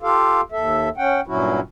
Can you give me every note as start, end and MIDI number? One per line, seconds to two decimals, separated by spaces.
0.02 0.41 65
0.02 0.41 67
0.02 0.41 69
0.02 0.41 77
0.52 0.89 39
0.52 0.89 69
0.52 0.89 76
0.97 1.21 61
0.97 1.21 78
0.97 1.21 79
1.27 1.60 43
1.27 1.60 46
1.27 1.60 54
1.27 1.60 61
1.27 1.60 64
1.27 1.60 66